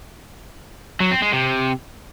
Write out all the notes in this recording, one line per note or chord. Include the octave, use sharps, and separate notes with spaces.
F#3
C4
G#3
C3